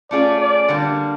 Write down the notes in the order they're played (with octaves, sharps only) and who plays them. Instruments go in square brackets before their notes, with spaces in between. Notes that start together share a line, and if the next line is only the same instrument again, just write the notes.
[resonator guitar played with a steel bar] A3 C#4 F4 G#4 [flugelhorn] D5
[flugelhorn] D5
[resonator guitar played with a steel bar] D3 G3 A#3